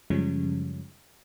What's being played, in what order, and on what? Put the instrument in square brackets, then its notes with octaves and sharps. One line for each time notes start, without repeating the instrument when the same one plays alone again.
[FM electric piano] F#2 C#3 F3 G3 G#3 C#4